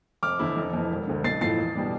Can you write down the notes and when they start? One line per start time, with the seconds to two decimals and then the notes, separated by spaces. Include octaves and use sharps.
0.23 F1 D6 F6
0.39 E2 D3 A3 E4
0.57 F1
0.73 F2 E3
0.91 E1
1.07 D2 D3
1.24 B1 A6 C7
1.41 A2 F3 A6 C7
1.58 E2
1.75 B2 G3 D4